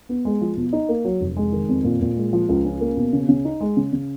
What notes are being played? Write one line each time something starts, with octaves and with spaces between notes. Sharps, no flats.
B3
G#3
F3
B2
D#4
A#3
F#3
F1
G#3
D#3
F2
A#2
A#2
G#3
F3
C#2
C#4
A#3
B2
C#3
C#3
D#4
G#3
C#3
C#3